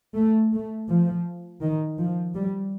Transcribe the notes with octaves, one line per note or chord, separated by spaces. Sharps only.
A3
A3
F3
D#3
F3
G3